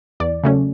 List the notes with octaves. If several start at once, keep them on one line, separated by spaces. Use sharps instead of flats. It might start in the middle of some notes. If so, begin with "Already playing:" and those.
E2 D5
C#3 F#3 A3 C#4